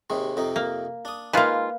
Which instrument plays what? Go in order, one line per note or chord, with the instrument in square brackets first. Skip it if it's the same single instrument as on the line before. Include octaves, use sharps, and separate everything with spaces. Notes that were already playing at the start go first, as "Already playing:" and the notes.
[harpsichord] D#2 C3 G#3
F2 C3 D#4
[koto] A#3
[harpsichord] D4 D#6
[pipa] D#3 G#3 F4 [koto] A#3 B4